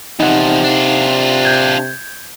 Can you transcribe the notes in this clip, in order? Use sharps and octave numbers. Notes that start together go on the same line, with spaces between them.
E2 C3 F3 D#4 F#5
D4 F4
G6 G#6